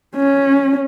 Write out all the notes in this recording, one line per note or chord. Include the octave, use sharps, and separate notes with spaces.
C#4